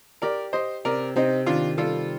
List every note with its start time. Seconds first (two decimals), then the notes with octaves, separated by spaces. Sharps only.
0.22 G4 A#4 D5
0.53 G4 C5 D#5
0.85 C3 A#4 D5
1.16 C3 C4 D#4
1.46 D#3 D4 F4
1.78 G3 F4 A4